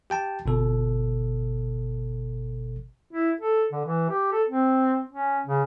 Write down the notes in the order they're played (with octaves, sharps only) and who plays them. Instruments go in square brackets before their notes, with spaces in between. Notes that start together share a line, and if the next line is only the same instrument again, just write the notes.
[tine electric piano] G4 G5 A5
G1 B2 A4
[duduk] E4
A4
D3
E3
G4
A4
C4
C#4
C#3